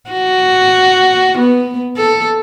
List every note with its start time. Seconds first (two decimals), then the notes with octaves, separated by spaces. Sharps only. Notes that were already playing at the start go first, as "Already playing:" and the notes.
0.11 F#4
1.39 B3
1.97 A4